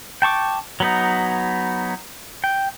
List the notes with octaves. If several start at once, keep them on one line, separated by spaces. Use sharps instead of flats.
G5 A5 C#6 D6
F#3 B3 D#4
G5